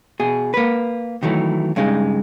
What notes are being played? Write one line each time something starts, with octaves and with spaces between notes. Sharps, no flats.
B2 G#4
A#3 B4
D#3 E3 F#3 A3
G2 C#3 G#3 D#4